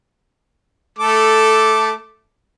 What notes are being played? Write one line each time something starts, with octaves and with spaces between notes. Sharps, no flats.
A3 A4 D6